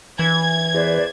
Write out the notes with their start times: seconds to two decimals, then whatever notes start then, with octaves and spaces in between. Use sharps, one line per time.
0.19 E3 G#6
0.74 E2 B4 C5 D5